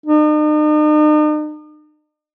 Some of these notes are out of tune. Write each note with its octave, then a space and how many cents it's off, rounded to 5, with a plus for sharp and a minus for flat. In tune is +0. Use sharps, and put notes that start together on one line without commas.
D#4 -45